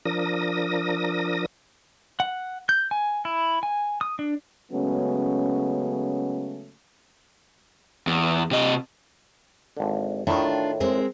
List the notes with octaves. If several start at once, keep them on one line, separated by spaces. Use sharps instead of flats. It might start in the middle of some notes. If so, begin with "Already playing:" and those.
F3 D4 A#4 D#6 A#6
F#5
G6
G#5
E4
G#5
D#6
D4
C#3 F#3 G#3 A3 B3 C#4
E2
C3 D#5
G#1 D3
A2 D#3 D4 F4
G#3 C4 A#4